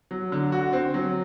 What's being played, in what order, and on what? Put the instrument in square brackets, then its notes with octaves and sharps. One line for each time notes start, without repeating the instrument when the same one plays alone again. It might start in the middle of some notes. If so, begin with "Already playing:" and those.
[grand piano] F#3
D3
F#4
C4
F#3